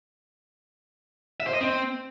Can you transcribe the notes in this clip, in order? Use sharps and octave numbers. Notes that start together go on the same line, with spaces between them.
E5
C5
D#5
C4